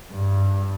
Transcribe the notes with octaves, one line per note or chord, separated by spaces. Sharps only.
G2